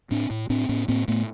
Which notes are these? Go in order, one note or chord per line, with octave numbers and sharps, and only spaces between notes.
A2 C4 D4
A2
A2 C4 D4
A2 B3 C#4
A2 A#3 C4
A2 A3 B3